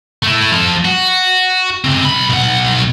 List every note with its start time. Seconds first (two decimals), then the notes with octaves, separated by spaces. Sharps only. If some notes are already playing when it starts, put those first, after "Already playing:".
0.23 A3 E4
0.51 F3 A4
0.85 F#4
1.84 C#3 C4
2.03 B1 B5
2.30 B1 F#5